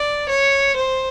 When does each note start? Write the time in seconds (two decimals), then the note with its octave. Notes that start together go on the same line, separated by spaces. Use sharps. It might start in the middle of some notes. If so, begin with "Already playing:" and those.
Already playing: D5
0.29 C#5
0.76 C5